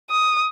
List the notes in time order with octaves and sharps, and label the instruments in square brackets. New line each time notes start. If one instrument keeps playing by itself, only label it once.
[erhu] D#6